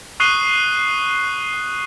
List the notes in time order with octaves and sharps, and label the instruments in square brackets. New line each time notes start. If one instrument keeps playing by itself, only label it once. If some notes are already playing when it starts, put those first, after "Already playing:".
[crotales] C#6 D#6 F#6 C7 D#7 G7